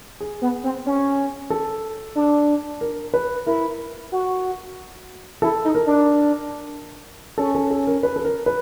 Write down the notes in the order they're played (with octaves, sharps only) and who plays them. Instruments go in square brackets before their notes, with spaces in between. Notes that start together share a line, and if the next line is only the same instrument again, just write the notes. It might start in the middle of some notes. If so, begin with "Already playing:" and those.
[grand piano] G#4
[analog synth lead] B3
C4
C#4
[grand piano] A4
[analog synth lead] D4
[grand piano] A#4
B4
[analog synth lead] E4 [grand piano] A#4
[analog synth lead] F#4
[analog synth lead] E4 [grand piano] A4
[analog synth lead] D#4
[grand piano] A#4
[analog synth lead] D4
[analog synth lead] C#4 [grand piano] A4
[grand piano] A4
A4
A#4
B4
A4
A#4
B4